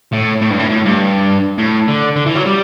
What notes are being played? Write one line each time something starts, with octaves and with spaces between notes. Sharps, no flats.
A2
A2
G2
A2
A2
G2
A2
D3
D3
E3
F#3
G3